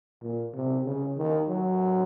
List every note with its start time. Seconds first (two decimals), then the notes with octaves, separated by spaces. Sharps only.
0.22 A#2
0.54 C3
0.85 C#3
1.17 D#3
1.49 F#3